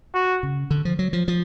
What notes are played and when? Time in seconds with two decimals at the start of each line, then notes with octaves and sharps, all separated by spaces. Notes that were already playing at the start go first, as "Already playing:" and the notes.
0.14 F#4
0.43 C#3
0.71 D3
0.85 F3
0.99 F#3
1.13 F3
1.28 F3